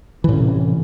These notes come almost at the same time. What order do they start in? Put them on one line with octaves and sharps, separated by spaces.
E3 A2 C#4 C3